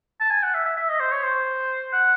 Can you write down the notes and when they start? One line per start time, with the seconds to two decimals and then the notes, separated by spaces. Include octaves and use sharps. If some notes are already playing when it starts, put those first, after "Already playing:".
0.20 A5
0.31 G#5
0.43 F#5
0.54 E5
0.66 E5
0.77 E5
0.89 D#5
1.00 C5
1.11 C#5
1.23 C5
1.93 F#5